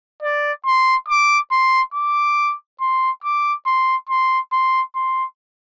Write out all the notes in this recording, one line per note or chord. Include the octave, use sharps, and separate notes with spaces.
D5
C6
D6
C6
D6
C6
D6
C6
C6
C6
C6